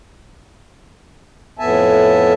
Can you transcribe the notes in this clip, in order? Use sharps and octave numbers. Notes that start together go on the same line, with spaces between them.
F2 A2 B3 E5 G#5 A5